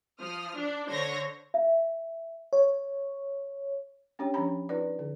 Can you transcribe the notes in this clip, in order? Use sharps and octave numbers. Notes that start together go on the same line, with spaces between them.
F3 D#6 F6
D4 D5
D3 C5 C#5 G#6 A#6
E5
C#5
C#4 D4 G4 C#5 G5
F3 C#4 D4 A#5 B5
D#4 F4 B4 D5
D3